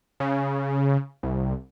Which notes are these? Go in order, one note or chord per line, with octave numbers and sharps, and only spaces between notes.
C#3
C2